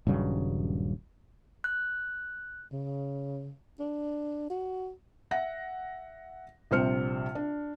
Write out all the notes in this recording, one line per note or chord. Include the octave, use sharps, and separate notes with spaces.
D#1 G2 C#3 F#3
F#6
C#3
D4
F#4
E5 F#5 A#6
A#1 C3 G3 C5 F6 C#7
D4